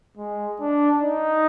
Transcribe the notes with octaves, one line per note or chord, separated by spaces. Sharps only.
G#3
D4
D#4